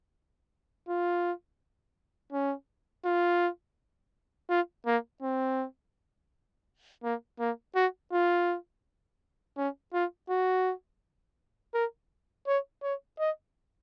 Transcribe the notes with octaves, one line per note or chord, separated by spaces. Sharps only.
F4
C#4
F4
F4
A#3
C4
A#3
A#3
F#4
F4
C#4
F4
F#4
A#4
C#5
C#5
D#5